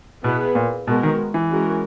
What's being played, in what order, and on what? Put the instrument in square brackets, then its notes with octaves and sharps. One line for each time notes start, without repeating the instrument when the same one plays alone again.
[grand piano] B2 [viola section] B3 E4 G#4 B4
[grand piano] A#2
[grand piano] B2 [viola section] G#3 B3 F#4 A#4
[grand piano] D#3
E3
[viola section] G#3 C#4 F#4 A#4